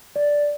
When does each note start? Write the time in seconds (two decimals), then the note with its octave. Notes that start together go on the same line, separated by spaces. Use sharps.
0.16 D5